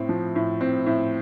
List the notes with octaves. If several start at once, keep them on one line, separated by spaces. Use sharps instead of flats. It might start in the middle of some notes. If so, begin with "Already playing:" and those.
Already playing: A2 C4
F3
A2
C4
A2